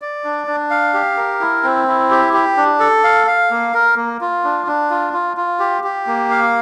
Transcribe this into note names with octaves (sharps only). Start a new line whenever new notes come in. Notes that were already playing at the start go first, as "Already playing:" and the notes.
D5
D4
D4
F5
G4
A#4
E4
C4
E4
G4
G4
D4
A4
F5
F5
A#3
A#4
A#3
F4
D4
D4
F4
F4
F4
G4
G4
A#3
F5